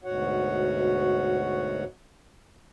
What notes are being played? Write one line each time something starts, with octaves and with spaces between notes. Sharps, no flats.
D2 G#2 B2 F#4 C#5 F#5